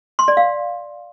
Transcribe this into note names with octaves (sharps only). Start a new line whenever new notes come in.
C6
D5
F5